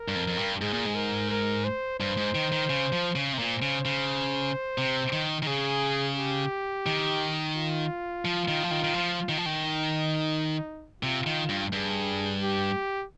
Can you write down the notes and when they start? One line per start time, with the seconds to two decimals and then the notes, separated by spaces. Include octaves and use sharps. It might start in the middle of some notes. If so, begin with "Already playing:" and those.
Already playing: A#4
0.08 G2
0.15 F2
0.27 F2
0.37 G2
0.61 G#2 G#4
0.73 A#2
0.86 G#2
0.95 A#4
1.30 A#4
1.64 C5
1.99 G2 C5
2.17 G#2
2.35 D#3
2.52 D#3
2.70 C#3
2.93 F3
3.16 C#3
3.33 C3
3.39 A#2 C5
3.62 C#3
3.85 C#3
4.78 C3
5.12 D#3
5.42 D#3
5.47 C#3 G#4
6.16 G4
6.86 D#3
7.56 F4
8.25 F3
8.48 D#3
8.63 F3
8.71 D#3
8.84 D#3
8.94 F3
9.29 D#3
9.38 F3
9.46 D#3
9.65 D#4
11.03 C3 F4
11.26 D#3
11.49 G2
11.73 G2 G#4
12.42 G4